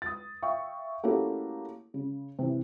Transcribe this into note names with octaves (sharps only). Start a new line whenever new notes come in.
D#6 A6
E5 F5 G5 C#6
A3 A#3 C#4 E4 F#4 G4
C#3
C3 E3